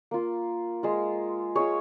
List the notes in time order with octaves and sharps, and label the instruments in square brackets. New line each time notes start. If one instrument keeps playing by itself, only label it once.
[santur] A#3 F4
G#3 F4
G#3 F4 G#4 C#5